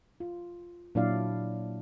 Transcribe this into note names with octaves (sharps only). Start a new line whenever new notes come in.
F4
A#2 F#3 D4 E4 D5 F5